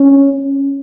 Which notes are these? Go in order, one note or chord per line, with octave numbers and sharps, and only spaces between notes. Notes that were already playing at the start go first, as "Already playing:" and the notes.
Already playing: C#4